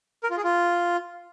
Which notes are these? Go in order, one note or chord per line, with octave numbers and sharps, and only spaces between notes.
A#4
F4
G#4
F4